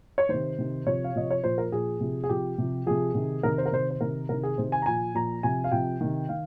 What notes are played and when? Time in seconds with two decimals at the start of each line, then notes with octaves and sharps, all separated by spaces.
0.18 C#5
0.29 C3 D#3 C5
0.58 C3 D#3
0.87 C3 F3 C#5
1.04 F5
1.15 C3 F3 D#5
1.31 C#5
1.44 A#2 F3 C5
1.58 A#4
1.72 A#2 F3 G#4
2.00 C3 F3
2.24 G#4
2.29 C3 F3 G4
2.58 C3 F3
2.86 C3 F3 G#4
3.15 C3 D#3
3.43 C3 D#3 A#4
3.58 C5
3.66 A#4
3.72 C3 D#3 C5
3.91 C5
4.01 C3 D#3 A#4
4.29 C3 D#3 A#4
4.43 G#4
4.58 C3 D#3 C5
4.72 G#5
4.82 A#5
4.86 A#2 F3 G#5
5.15 A#2 F3 A#5
5.43 C3 F3 G#5
5.64 F5
5.72 C3 F3 G5
6.01 C3 D#3
6.29 D#3 F5